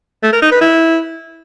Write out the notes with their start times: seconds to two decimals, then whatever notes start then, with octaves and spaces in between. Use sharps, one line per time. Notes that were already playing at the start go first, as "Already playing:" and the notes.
0.23 A3
0.33 A#4
0.42 D#4
0.52 B4
0.61 E4